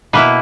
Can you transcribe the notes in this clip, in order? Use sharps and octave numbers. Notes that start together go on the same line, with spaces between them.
B2 A#3 E4 B4